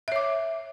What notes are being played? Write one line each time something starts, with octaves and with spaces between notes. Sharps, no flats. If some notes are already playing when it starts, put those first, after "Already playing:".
C#5 E5 D6